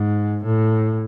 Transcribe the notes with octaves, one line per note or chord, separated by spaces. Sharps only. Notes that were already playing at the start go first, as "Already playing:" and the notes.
Already playing: G#2
A2